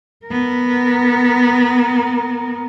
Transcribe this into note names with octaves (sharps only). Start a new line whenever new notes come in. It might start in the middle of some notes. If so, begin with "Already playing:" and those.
B3 A#4